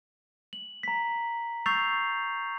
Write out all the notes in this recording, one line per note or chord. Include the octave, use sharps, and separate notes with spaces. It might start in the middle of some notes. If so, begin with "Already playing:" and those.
F#7
A#5 B6
C#6 E6 G6 A6 C7 F7